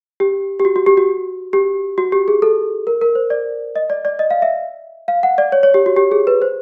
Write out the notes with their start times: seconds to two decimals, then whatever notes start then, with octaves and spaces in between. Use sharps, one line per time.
0.20 G4
0.59 G4
0.65 F#4
0.76 F#4
0.86 G4
0.97 F#4
1.53 G4
1.98 F#4
2.12 G4
2.28 G#4
2.42 A4
2.87 A#4
3.01 A#4
3.15 C5
3.30 D5
3.76 D#5
3.90 D5
4.05 D5
4.19 D#5
4.31 F5
4.42 E5
5.08 F5
5.23 F#5
5.38 D5
5.52 C#5
5.63 C#5
5.74 G4
5.86 F#4
5.96 G4
6.11 G#4
6.27 B4
6.42 C5